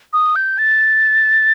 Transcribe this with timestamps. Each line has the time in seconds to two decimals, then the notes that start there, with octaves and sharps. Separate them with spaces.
0.13 D#6
0.36 G6
0.58 A6